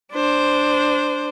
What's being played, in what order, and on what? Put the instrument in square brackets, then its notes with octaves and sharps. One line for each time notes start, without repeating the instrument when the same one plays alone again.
[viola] D4 C5